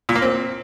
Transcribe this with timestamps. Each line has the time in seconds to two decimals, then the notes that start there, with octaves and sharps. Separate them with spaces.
0.09 A#2
0.15 A#3
0.22 C4